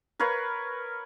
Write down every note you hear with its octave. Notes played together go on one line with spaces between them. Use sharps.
A#4 B4 C#5 F5